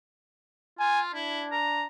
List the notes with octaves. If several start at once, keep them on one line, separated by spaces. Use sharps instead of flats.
F4 G#5
D4 E4
A#5